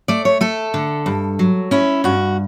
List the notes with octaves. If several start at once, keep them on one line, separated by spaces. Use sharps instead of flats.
A3 D5
C#5
A3 A4
D3
G2
F#3
C#4 E4
G2 F#4